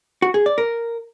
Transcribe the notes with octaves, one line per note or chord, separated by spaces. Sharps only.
F#4
G#4
D5
A#4